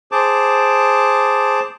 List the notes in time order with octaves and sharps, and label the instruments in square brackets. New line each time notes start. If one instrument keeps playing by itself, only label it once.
[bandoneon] G#4 C5 A5 D6